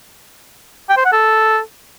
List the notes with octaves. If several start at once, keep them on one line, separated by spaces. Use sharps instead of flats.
G5
C5
F#5
A4